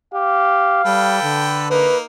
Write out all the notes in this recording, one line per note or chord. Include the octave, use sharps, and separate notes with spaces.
G4 F5
G3 A4 B4 G5
D3
A#3 D#4 B4